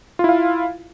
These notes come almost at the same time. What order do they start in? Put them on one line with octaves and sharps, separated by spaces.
F4 E4 F5